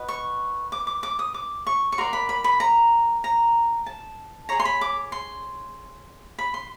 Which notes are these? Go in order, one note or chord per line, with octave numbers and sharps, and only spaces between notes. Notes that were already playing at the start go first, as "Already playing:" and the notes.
Already playing: F#4 B4 D#5
C#6
D6
D6
D6
D#6
D6
C#6
C#6
F#4 A#4 D5 C6
B5
B5
B5
A#5
A#5
A5
G#4 C#5 A#5
C6
B5
D6
C6
B5
C6